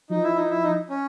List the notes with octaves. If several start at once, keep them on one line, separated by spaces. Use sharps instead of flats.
F3 D#4
E4
D#4
E4
D#4
C#4